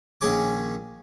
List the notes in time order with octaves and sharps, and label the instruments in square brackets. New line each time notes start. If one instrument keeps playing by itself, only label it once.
[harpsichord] A#1 D#3 C#4 G#4 C#5 D6